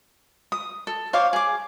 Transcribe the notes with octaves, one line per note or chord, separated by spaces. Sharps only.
D#6
A4
C5 C#5 F5 D6
G#4 D6